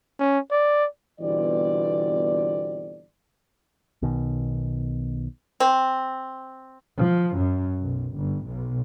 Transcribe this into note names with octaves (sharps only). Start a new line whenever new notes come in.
C#4
D5
G1 B2 E3 C4 D5
B1 B2 D#3
C4
F3
F#2
B1
G1
B1